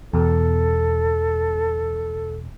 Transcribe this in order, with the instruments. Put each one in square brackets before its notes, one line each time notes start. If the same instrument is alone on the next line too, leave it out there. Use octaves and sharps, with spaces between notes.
[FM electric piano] E2 B2 [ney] A4